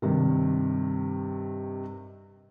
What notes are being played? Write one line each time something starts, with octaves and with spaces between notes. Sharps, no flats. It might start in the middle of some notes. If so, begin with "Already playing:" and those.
G2 C3 D#3